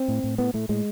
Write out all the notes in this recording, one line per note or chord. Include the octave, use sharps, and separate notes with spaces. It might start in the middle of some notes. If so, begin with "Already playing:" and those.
Already playing: C4
A2
A2
A2 B3
A2 A3
A2 G#3